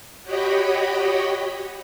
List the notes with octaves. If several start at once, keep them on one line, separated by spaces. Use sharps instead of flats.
F#4 G4 C#5 D#5 G5 B5